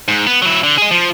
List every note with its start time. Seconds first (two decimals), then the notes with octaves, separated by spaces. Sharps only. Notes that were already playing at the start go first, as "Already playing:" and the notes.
0.08 G#2
0.27 B3
0.42 F#3 E4
0.63 D3
0.78 G#4 D#5
0.91 F3